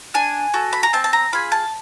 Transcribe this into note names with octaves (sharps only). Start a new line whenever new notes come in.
D4 G#5
F#4 A4
B5
A#5
C4 A5
A5
A#5
F4 G#4 B5
A5